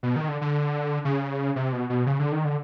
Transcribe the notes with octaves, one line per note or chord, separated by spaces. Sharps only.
B2
D#3
D3
D3
C#3
C3
B2
B2
C#3
D3
D#3
D3